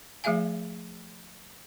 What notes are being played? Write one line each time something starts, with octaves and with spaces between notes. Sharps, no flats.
F3 A3 G#4 E5 F5 G#5